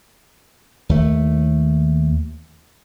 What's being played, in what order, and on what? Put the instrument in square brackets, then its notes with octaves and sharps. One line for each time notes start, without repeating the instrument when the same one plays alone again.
[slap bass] D#2 A3